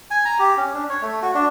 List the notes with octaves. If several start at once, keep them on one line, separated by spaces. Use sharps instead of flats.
G#5
A#5
G4
C#4
D4
C#5
A3
F#4
D4